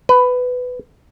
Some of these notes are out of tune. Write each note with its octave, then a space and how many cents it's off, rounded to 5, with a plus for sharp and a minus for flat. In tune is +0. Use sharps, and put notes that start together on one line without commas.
B4 +15